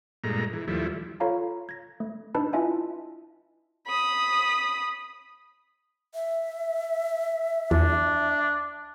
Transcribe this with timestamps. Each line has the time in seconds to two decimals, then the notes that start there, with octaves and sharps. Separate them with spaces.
0.24 G2 A#2 G#3 A3 A#5
0.53 E3
0.68 D#2 F3 G3 A3 E4
1.20 F4 A4 C#5 F5 A#5 B5
1.69 G#6 A#6
2.00 A3
2.35 D4 D#4 B4 D#5 A5 B5
2.53 E4 F4 D#5 E5 G#5 A5
3.87 B5 D#6
6.14 E5
7.71 E2 D4